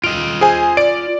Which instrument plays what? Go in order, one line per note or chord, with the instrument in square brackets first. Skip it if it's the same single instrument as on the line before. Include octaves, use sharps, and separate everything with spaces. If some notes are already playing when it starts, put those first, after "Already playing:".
[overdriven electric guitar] F4 D#5 [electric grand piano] D7
[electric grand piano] G#4 C5 G#5
D5 D7